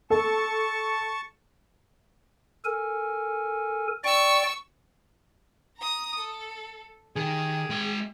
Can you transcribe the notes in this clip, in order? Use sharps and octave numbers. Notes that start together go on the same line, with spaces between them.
A4 A5 C#6
A4 A#4 G#5
D5 G5 C#6 E6
A#5 D#6
A4
D#3 G4 G#4
G#3 G5